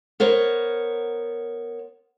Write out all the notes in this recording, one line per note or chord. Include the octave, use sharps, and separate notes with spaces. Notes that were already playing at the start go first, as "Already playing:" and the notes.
B3 A#4 C5 C#5